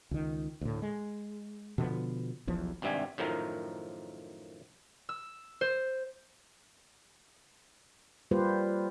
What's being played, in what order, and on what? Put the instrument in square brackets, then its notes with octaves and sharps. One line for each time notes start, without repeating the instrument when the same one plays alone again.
[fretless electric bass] C#2 D#3
D2 A2
G#3
B2 D3 F3 B3
E1 B1 E2 F3
[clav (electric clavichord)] G#1 G2 C3 G3 E5 G#5
F#2 A2 D#3 F3 A#4
[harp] E6
C5
[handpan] G3 A#3 F4 G4 B4 C5